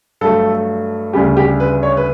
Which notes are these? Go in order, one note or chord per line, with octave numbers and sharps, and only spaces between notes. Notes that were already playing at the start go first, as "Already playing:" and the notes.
G2 F#3 A3 A4
D2 C#3 G3 G4
G4
B4
C#5
B4